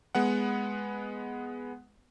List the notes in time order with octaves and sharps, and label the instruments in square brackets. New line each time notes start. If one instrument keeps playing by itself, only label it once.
[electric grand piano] G#3 B3 F#5